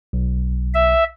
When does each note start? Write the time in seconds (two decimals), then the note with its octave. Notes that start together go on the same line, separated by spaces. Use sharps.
0.13 B1
0.74 E5